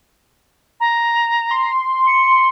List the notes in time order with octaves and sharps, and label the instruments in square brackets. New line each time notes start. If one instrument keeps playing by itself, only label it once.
[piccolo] A#5
[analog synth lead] C6
[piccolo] C#7